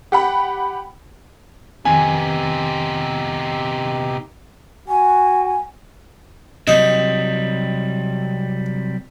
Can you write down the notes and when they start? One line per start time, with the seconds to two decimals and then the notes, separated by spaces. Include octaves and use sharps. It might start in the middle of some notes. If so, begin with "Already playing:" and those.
0.12 G4 F#5 B5
1.85 F2 C3 D#3 B3 C4 D#4 G4 G#5
4.88 F#4 G#5
6.67 C3 F#3 G3 D#4